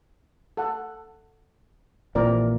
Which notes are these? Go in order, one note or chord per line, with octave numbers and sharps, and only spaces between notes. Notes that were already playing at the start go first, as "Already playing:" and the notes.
A4 F#5
A#1 A#2 E3 C4 A#4 D5